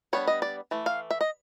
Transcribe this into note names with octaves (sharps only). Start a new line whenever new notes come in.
G3 B3 D4 C#5
D#5
D5
E3 A3
F5
E5
D#5